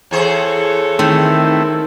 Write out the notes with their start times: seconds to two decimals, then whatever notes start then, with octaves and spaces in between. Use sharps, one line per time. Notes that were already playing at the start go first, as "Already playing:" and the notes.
0.11 E2 G#4 A4 C5 C#5
0.99 D#3 A3 C4 E4